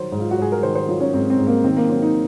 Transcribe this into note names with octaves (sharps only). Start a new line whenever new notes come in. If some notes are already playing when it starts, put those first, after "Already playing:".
Already playing: D#3 F#3 A#4 C5
G#2
F4
F#4
G#2 G#4
A#4
D#3 C5
C5
F#3 F4
C#4
G#2 C4
C4
G#2
A#3
D#3 C4
A#3
F#3 C4
D#4